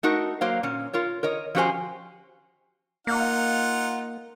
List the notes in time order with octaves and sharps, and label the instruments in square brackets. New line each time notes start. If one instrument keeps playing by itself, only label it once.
[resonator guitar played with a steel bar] A3 D#4 F#4 A#4
F#3 A#3 C5 F5
A#2 C#4
F4 A#4 C#5
A#4 C#5 D#5
F3 C#4 F#4 G4 C5 G#5
[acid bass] A#3 [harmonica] D#4 F4 F#5